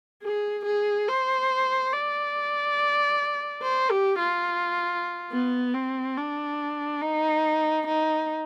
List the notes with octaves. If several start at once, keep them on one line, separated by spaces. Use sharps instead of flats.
G#4
G#4
C5
D5
C5
G4
F4
B3
C4
D4
D#4
D#4